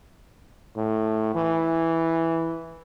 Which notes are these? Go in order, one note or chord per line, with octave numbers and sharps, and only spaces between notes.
A2
E3